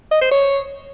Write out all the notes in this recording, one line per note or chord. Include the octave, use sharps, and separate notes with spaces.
D#5
C5
C#5